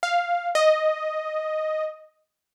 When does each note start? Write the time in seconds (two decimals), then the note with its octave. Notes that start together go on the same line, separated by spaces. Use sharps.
0.03 F5
0.55 D#5